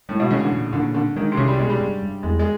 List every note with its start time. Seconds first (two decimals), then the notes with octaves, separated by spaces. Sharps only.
0.09 A2 G#3
0.20 B2
0.30 C#3 E3
0.41 D3
0.52 A#2
0.73 A#2 D3
0.95 D3 C4
1.16 D#3 G#3
1.32 C3
1.37 C2 C#3
1.48 G3
1.59 B2 G#3
1.70 G3
1.80 G2
2.02 G2
2.23 E2 G#3
2.39 G#3